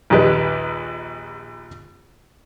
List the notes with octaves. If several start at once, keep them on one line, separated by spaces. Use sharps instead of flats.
A#1 D#2 G4 B4